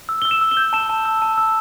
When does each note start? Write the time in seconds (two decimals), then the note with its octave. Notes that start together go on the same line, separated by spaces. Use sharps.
0.09 E6
0.22 E6 G7
0.31 E7
0.41 E6
0.51 G7
0.57 G6
0.73 A5 E7
0.90 A5
1.05 E6
1.22 A5
1.38 E6